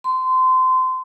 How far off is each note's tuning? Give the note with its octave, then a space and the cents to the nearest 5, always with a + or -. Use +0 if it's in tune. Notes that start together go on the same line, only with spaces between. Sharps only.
C6 -25